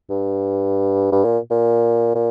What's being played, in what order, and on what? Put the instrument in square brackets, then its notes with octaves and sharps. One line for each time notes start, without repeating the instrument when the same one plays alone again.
[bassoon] G2
G2
A#2
A#2
A#2